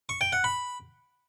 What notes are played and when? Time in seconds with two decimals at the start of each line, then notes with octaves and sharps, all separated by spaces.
0.09 C#6
0.21 G5
0.33 F#5
0.44 B5